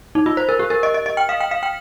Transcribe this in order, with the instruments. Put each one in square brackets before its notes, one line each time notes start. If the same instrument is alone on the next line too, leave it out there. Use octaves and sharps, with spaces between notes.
[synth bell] D#4
F4
C5
A#4
G4
A#4
D#5
D#5
D#5
G5
F5
G5
F5
G5